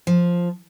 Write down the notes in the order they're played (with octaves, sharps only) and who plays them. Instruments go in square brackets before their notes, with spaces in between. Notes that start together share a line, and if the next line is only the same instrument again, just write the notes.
[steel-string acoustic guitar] F3